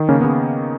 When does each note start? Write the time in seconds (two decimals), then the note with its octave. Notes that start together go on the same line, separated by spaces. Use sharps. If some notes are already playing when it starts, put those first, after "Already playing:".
Already playing: D#3
0.09 C#3 A#3 C#4
0.21 B3
0.24 C#3